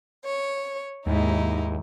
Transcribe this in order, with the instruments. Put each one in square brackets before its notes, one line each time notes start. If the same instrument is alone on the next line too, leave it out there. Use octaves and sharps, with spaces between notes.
[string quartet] C#5
[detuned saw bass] D#2 [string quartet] G#2 D#4 E4